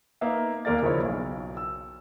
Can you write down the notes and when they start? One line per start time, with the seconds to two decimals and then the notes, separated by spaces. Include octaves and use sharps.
0.21 A#3 B3 D#4 E5 F5
0.65 D#2 A#3 A#4 D5 A6
0.82 C#3 F3 D#4 E4 C#5
1.03 B1
1.57 E6